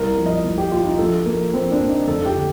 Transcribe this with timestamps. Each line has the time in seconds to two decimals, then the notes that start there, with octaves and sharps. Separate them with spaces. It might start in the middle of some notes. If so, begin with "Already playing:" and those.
Already playing: C2 A#4
0.17 F3
0.26 D#5
0.44 C2
0.58 G4
0.71 A#2 F4
0.85 D#4
0.99 A#1 A4
1.25 F3 A#3
1.53 A#1 C4
1.72 D4
1.80 A#2
1.90 D#4
2.07 F1 A4
2.26 G4
2.35 D3